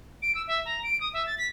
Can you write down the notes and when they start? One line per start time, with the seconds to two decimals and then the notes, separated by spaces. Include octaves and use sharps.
0.22 D7
0.35 E6
0.48 E5
0.65 A#5
0.83 D7
1.01 D#6
1.13 E5
1.26 A6
1.38 B6